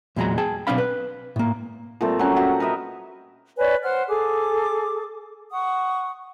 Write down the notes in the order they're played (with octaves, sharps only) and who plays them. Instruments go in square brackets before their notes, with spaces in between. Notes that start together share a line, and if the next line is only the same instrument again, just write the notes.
[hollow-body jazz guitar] E2 A#2 F#3 G#3 A#5
G#4 G5 A5
B1 G2 C4 D4 F5 B5
B4
A2 A#3
[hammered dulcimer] A#2 G3 A3 C4
F#3 C#4
F#4 G4 C5 A#5
A#4 B4 D#5 E5
[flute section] B4 C#5 D5 G#5
C5 F#5 F6
G#4 A4 D6
F#5 C#6 D#6